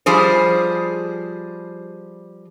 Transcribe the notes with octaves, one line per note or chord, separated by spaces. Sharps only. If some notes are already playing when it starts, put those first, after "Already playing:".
F3 G3 G#4 C5